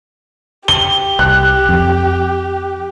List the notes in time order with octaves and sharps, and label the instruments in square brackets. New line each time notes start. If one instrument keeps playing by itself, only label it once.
[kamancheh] G4 [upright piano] G7
[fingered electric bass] C2 [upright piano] F#6
[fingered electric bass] F2